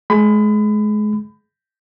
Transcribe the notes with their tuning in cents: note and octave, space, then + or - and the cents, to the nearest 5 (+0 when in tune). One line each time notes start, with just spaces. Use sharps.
G#3 +30 B5 +30